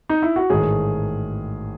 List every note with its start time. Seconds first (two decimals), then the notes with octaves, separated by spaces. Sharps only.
0.09 D#4
0.23 E4
0.36 F#4
0.50 A1 G#2 D#3 G#4